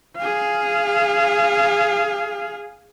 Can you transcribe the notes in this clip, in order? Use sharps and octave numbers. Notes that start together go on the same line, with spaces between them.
G#4 F5